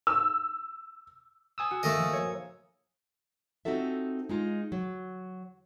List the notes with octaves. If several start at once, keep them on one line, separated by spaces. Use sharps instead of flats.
E6
G#5 D#6 E6
F#4
D#3 A3 A#3 A4 D#5 E7
F3
C#5
C4 D#4 F4 F#4 A4 E5
G#3 D#4 F4
F#3